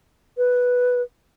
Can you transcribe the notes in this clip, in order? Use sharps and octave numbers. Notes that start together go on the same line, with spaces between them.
B4